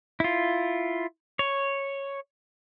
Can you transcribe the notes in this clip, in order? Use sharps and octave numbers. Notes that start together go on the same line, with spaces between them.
E4 F4
C#5